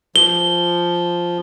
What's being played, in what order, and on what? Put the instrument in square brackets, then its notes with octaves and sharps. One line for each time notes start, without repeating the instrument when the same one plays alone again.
[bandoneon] F3 [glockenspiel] G7